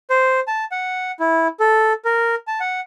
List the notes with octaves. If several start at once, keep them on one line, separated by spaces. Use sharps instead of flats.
C5
A5
F#5
E4
A4
A#4
A5
F#5